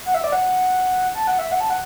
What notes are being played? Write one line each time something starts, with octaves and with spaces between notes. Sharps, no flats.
F#5
E5
D5
F#5
A5
F#5
E5
F#5
A5
F#5